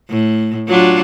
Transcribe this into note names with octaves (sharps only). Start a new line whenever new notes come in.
A2
F#3 D4 F4